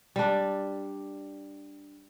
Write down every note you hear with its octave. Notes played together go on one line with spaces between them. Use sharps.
G3 D4